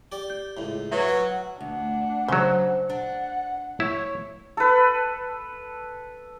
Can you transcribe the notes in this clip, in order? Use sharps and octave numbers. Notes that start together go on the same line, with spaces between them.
G4 D5
G6
C#2 A2
F#3 B4 C#5 E5
F#4 B4
F#5
D2 D4 F#5
C#3 F#3 C5
D4 F#5
E4 C#5
A4 B4